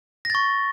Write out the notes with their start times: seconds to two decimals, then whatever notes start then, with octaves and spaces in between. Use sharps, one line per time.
0.25 A#6
0.30 A6
0.35 C#6